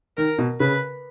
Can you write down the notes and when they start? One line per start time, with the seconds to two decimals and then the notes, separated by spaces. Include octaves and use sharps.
0.17 D#3 A#4
0.38 B2
0.60 C#3 B4